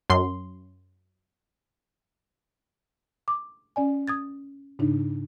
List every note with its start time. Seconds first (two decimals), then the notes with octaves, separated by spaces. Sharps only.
0.10 F#2 C6
3.28 D6
3.76 C#4 D5 G#5
4.08 D#6 G#6 A6
4.79 G#2 C#3 D4 D#4